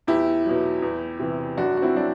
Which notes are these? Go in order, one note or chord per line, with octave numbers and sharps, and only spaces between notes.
E2 E4 G4
B2 F#3
E2
C3 E3
F#2 D4 F#4
F#4
C4 E4
F#3 D4